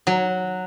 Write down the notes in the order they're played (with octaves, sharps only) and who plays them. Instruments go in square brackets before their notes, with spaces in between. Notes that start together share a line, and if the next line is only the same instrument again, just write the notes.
[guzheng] F#3